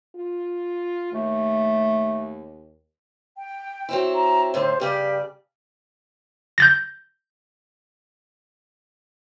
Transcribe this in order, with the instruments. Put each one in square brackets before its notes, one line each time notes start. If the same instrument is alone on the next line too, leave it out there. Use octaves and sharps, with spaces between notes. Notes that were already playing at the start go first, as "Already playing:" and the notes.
[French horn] F4
[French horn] D#2 [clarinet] A3
[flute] G5
[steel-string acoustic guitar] F#3 C4 E4
[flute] A#5
[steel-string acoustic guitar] A2 D3 D#3 [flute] C5
[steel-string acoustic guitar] G2 C#3 D5 [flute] G4
[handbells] G6 A6 A#6